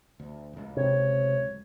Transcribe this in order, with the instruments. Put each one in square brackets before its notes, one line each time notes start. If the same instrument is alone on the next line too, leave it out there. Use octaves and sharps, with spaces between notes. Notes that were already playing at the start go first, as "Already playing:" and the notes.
[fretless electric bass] D2
D1 C#2
[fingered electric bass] C3 [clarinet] C#5